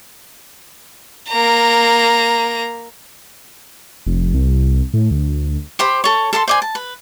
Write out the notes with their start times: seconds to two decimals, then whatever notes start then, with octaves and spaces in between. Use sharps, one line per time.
1.30 A#3 A#5
4.06 F1
4.34 C2
4.94 A2
5.11 D2
5.79 G4 C5 B5
6.04 A4 C#5
6.33 A4 A5 A#5 C6
6.48 C5 D5 G#5
6.62 A5
6.75 B4